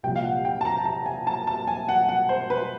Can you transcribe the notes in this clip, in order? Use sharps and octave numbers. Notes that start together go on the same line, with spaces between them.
C2 A#2 F3 G5
F5
F#5
G5
A5
A#5
A5
G#5
A5
A5
G#5
F#5
F#5
C5
B4